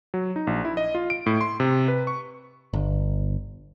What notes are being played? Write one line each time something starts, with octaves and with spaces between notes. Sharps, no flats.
F#3
D#4
A#1
E4
D#5
F4
D7
A2
C6
C3
B4
C#6
G1